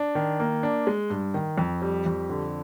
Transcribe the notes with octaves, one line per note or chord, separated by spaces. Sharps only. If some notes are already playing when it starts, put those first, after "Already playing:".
Already playing: D4
D#3
A#3
D4
G#3
G2
D#3
F2
G3
F2
D3